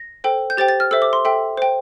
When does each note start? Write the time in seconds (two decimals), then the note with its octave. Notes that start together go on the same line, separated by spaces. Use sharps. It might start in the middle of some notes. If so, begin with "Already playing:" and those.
Already playing: A#6
0.24 A4 C5 G5
0.50 G6
0.57 G4 C5 G5 A6
0.68 A6
0.80 F6
0.91 A4 C5 E5 E6
1.02 D6
1.13 C6
1.25 A4 E5 G5
1.57 C5 G5